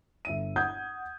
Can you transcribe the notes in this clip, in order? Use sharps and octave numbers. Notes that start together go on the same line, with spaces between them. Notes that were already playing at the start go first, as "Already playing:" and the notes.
G1 E5 D#7
F#5 D#6 G6 G#6